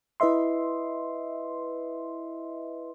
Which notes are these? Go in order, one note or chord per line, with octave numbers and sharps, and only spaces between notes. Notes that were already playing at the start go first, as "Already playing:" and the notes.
E4 B4 D#5 E5 C6